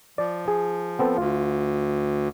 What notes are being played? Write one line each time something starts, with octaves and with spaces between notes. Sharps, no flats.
F3 D5
G#4
B3 C4 A4
D2 F4